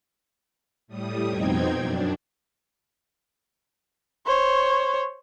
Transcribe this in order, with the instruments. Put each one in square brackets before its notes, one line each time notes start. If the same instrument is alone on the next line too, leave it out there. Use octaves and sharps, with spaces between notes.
[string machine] A2 G3 D#6
F2 B2 C4 D#4 G5 G#6
F#2 D4
[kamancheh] C5 C#5